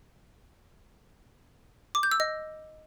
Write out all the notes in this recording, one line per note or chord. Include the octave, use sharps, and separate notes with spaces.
D6
G6
E6
D#5